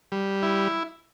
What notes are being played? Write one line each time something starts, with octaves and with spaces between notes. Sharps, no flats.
G3
E4